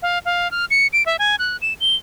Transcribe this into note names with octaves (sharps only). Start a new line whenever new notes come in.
F5
F5
F6
C#7
D7
E5
G#5
F#6
E7
G7